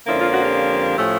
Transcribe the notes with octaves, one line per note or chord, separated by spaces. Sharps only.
F2 D3 F3 A#3 C#4 E4
F4
F#4
G4
A2 F3 A3 C#4